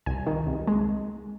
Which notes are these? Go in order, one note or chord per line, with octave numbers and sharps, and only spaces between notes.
C2 G#5
D#3
C2
G#3